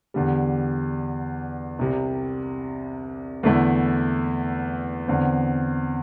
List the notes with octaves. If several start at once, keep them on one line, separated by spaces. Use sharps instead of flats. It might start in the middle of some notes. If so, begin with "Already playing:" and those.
E2 D3 G3
C2 C3 G3
E2 D3 A3 E4
E2 D3 C4